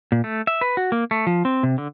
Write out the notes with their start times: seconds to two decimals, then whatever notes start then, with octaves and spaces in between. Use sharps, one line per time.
0.12 A#2
0.24 A3
0.47 E5
0.61 B4
0.77 F#4
0.92 A#3
1.11 A3
1.27 F3
1.45 C4
1.63 C3
1.78 D3